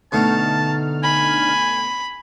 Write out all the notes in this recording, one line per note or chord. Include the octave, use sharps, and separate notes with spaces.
B2 D3 A3 D#4 A5 F6
G#5 B5